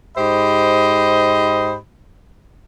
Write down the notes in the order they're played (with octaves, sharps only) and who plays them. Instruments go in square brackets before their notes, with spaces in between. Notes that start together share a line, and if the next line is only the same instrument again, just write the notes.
[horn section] G#2 G4 C5 D#5 B5